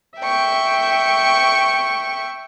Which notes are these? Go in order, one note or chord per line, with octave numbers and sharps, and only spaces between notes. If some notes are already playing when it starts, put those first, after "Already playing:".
E5 G5 C#6